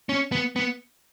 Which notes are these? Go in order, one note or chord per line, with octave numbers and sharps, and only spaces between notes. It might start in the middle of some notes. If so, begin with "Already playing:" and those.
C#4
B3
B3